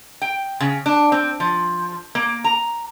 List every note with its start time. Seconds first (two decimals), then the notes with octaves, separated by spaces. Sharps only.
0.22 G5
0.60 C#3
0.86 D4
1.12 C4
1.40 F3
2.15 A#3
2.44 A#5